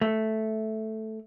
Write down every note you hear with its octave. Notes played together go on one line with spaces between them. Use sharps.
A3